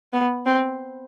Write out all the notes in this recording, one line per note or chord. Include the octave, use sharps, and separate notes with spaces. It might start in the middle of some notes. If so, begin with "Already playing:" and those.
B3
C4